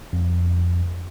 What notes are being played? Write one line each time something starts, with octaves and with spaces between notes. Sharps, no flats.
F2